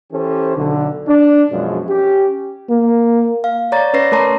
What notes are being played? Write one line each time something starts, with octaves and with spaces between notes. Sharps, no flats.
E3 C#4 G4 A4 C5
B1 D3
D4
F#2 B2 F3 G#3
C#4 G4
A#3
F5
C#5 D5 A#5 A6
C#4 B4 C#5 A#6 C7
A3 A#4 C#5 A5 A#5 C6